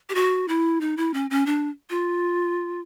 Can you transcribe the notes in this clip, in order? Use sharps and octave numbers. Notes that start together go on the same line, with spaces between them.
G4
F#4
E4
D#4
E4
C#4
C#4
D4
F4